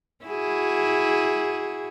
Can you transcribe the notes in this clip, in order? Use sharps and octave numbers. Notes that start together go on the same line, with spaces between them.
E4 F#4 G#4